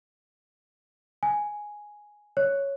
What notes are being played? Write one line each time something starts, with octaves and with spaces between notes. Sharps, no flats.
G#5
C#5